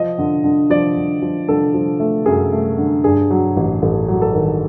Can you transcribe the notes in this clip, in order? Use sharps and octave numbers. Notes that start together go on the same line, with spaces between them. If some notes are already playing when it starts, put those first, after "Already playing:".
Already playing: F3 D#5
D3
D3
F3 D5
D3
F3
D3 A4
F3
A3
F#2 G#4
A3
D3
G2 G#4
F#3
A1
A1 A4
F#3
A4
D#3